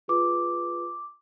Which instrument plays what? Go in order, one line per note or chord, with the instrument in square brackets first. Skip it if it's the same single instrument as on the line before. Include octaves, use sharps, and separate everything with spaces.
[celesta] F4 G#4 B4 D6